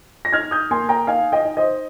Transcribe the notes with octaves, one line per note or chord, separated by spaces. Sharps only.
A#6
D#4 F6 G#6
D#6 G6
A#3 G#5 C6
G5 A#5
D#4 F5 G#5
D#5 G5
D#4
C5 D#5